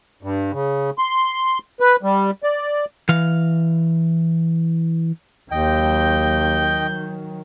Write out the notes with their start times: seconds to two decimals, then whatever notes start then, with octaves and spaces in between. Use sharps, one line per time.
0.23 G2
0.52 C#3
0.98 C6
1.80 B4
2.03 G3
2.43 D5
3.09 E3 F5
5.51 D#2 D#3 F#3 D#5 G5 G6